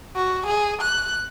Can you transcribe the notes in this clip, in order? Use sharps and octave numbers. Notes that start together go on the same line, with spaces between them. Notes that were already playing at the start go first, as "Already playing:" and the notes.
F#4
G#4
F#6